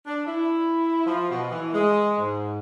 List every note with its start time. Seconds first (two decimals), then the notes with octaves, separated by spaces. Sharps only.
0.06 D4
0.26 E4
1.06 F3
1.30 B2
1.51 E3
1.74 G#3
2.18 G#2